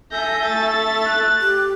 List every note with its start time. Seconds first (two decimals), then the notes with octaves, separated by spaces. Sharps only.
0.12 A4 E5 G#5 G6 A#6
0.44 A3 A6
1.06 F#6
1.41 G4